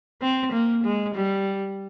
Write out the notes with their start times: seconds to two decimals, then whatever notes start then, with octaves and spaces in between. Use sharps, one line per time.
0.22 C4
0.53 A#3
0.84 G#3
1.15 G3